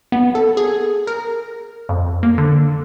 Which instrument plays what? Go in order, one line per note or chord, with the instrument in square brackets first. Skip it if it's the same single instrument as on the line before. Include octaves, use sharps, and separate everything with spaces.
[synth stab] B3
A4
G#4
A#4
F2
A#3
D3